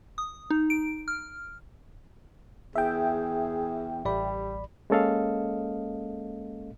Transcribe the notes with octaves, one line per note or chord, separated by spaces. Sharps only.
D#6
D#4
D7
F6
E2 G#4 E5 G5
A1 G3 D5 B5
G#3 A#3 C#4 A4 D#5 F5